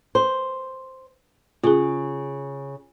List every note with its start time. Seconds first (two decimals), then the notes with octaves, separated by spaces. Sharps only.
0.15 C5
1.64 C#3 F4 G#4